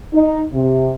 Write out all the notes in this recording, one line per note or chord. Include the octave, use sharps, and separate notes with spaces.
D#4
C3